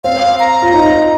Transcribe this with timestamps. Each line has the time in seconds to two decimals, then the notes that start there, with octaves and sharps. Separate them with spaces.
0.04 C4 F5
0.40 A#5
0.62 F4
0.74 D#4